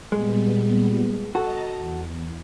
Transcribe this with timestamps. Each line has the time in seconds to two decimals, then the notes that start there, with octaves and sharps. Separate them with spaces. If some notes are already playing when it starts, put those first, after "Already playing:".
0.12 A#2 G3 G#3 B3
1.35 F#4 A4 D#5 A5 A#5
1.78 E2